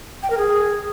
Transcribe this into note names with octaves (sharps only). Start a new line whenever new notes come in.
G5
A#4
G#4